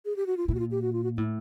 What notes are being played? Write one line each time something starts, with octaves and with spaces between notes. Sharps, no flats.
G#4
G4
F#4
F4
A#2 E4
F#4
F4
G4
F#4
F4
F#4
A2 E4